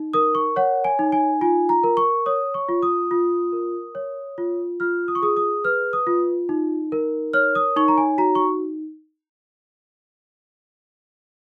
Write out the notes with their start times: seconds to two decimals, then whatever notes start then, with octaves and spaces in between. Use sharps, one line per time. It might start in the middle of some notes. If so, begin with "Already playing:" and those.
Already playing: D#4
0.13 A#4 D#6
0.35 C#6
0.56 C#5 F#5
0.84 G#5
0.99 D#4
1.12 G#5
1.41 F4 G#5
1.69 A#5
1.83 A#4
1.97 C#6
2.26 C#5 D#6
2.54 C#6
2.69 F4
2.82 D#6
3.11 F4
3.52 A#4
3.95 C#5
4.38 F4
4.80 F4 F6
5.08 D#6
5.15 C#6
5.22 G#4 D#6
5.37 D#6
5.64 B4 F6
5.93 D#6
6.07 F4
6.49 D#4
6.92 A#4
7.33 C#5 F6
7.55 D#6
7.76 D#4 C#6
7.88 A#5
7.98 G#5
8.18 F#4 A#5
8.35 C#6